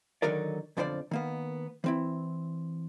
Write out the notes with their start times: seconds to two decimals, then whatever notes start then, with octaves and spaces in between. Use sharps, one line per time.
0.22 D3 D#3 F#3 D#4 A#4 D5
0.77 B1 F2 D3 F3 C5 D5
1.11 D#3 A#3 B3
1.84 E3 C4 E4